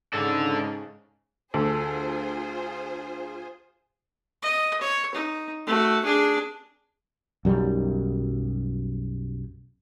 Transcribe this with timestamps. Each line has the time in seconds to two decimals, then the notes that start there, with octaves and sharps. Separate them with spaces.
0.13 G#2 C#3 D4 A4
1.54 D2 F4 G#4 A4 C5
4.43 D#5
4.81 C#5
5.15 D#4
5.67 A3 F#4
6.04 D4 G#4
7.45 B1 F#2 G3